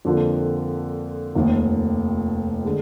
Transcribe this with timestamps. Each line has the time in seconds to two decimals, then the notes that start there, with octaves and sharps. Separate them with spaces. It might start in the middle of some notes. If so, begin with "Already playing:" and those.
0.05 F2 D3 F3 A#3
1.35 F1 D#2 D#3
2.65 D3 G#3